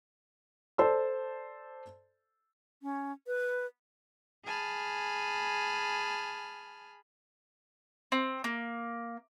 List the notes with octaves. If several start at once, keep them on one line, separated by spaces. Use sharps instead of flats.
A4 C5 D5 A5 C6 E6
C#4
B4
G#4 G#5 A5 B5 F6
C4
A#3